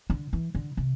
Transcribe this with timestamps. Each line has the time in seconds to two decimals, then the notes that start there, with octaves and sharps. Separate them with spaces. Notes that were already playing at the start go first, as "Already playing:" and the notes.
0.10 D3
0.33 E3
0.55 D3
0.77 C3